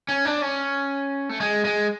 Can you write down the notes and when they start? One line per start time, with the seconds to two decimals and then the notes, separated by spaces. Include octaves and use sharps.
0.09 C#4
0.25 D4
0.42 C#4
1.29 A3
1.40 G#3
1.65 G#3